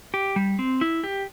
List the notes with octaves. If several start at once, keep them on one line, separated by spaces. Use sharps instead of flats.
G4
G3
C4
E4
G4